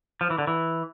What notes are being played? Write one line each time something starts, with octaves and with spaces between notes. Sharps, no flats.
F3
E3
D3
E3